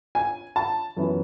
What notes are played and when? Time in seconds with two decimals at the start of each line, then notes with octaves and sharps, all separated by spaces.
0.15 G#5
0.56 A5
0.97 F#2 E3 B3 E4